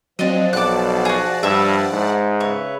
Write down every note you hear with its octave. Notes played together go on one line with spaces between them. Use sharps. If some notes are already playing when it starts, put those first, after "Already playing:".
F3 F#3 C4 D4 D#5
B1 D5 F#5 A5 D6 F#6
F#4 G#4
G2 E5 B5
G#2
C#3 B4 C#5 E5